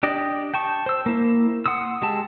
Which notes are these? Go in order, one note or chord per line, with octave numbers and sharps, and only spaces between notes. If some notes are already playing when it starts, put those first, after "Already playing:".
D4 G4 D5 D#5
G5 A5 C#6
C5 E6
A#3 E4
F#5 C6 D#6 E6
G#3 G4 A5